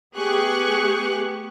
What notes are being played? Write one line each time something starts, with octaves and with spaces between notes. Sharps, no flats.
A3 B3 G4 G#4 C#6 F#6